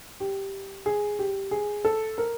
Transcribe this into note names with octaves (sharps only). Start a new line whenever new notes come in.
G4
G#4
G4
G#4
A4
A#4